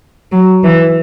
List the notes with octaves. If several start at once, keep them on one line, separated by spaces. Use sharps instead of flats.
F#3
E3